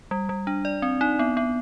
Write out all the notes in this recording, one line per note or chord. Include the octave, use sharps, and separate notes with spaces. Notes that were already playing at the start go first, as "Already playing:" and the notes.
G3
G3
D4
D5
C4
D#4
B3
B3